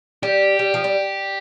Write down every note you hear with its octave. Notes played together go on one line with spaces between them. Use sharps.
G3 G4
G3
F3
G3